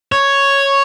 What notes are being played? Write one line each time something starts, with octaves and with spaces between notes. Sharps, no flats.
C#5